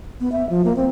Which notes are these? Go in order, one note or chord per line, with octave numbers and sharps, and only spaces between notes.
B3
E5
F3
A#3
C4